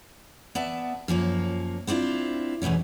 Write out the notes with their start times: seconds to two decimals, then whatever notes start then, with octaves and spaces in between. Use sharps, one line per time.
0.55 B3 D5 E5 A5
1.08 F#2 F3 A#3 C#5
1.87 B3 C4 D4 E4 F4
2.62 E2 G#2 B2 A3 C#4